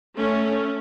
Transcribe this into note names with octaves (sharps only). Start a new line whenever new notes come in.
A3 C#4